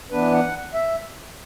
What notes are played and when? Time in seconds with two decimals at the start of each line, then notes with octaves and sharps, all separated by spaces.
0.11 E3 B3 D4 B4
0.32 F#5
0.74 E5